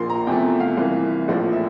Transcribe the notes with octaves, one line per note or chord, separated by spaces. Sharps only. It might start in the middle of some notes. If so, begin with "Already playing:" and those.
Already playing: A#1 A#2 F3 A#3 C6
A#5
E2 C3 F3 A3 G5
F5
C2 C3 E3 A#3
A#1 A2 F3 A#3
E5